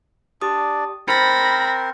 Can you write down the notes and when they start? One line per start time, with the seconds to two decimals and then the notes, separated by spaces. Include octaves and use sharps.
0.41 D4 G4 D5 D#6
1.08 C4 A#4 C5 B5 A6 A#6 C#7